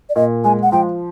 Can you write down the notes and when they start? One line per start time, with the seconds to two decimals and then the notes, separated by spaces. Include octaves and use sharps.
0.09 D5
0.16 A#2 D#5
0.44 G#3 G#5
0.63 F#5
0.72 F3 G5